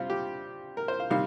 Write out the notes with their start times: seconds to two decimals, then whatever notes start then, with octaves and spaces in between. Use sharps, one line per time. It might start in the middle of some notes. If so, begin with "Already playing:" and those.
Already playing: C3 G3 C4 F4
0.10 G4
0.77 A#4
0.88 C5
1.00 F5
1.10 C3 D#3 G3 F5